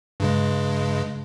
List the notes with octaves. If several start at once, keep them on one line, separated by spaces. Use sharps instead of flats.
G2 C#3 G#3